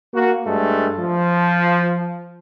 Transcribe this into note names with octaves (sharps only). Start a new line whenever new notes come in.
A#3 F#4
G2 G#3 A3
F3